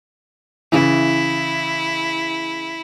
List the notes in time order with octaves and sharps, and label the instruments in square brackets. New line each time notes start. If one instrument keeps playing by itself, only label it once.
[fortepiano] C#3 E3 [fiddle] E4